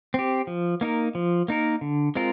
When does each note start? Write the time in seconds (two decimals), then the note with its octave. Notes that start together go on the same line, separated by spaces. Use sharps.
0.14 C4 G4
0.47 F3
0.81 A#3 D#4 A#4
1.15 F3
1.48 A#3 D#4 A#4
1.81 D3
2.15 G#3 C4 F4 A#4